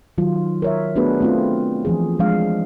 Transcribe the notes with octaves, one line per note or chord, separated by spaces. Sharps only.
D#3 F#3 F4
A#4 C#5 E5
A3 B3 D4 F#4 G#4 B4
A3 C4 F4
E3 F3 G#4
F3 G#3 D4 F5